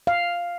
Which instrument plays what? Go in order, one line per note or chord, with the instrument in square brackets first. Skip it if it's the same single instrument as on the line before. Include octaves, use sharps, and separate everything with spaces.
[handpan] F5